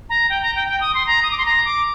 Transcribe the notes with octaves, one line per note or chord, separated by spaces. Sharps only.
A#5
G5
A#5
G5
G5
D#6
C6
A#5
D#6
D6
C6
A#5
D6